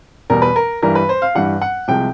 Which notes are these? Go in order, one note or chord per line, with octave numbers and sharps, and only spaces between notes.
E2 B2 G3 A#4
B4
A#4
G2 E3 G3 A#4
B4
C5
F5
G2 E3 G3 F#5
F#5
C2 C3 F3 G#3 G5